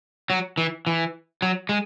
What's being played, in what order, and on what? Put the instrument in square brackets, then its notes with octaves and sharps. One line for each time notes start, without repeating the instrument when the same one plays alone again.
[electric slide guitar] F#3
E3
E3
F#3
G#3